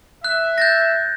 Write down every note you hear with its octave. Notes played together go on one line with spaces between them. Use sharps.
E5 F#6
G6 A6 A#6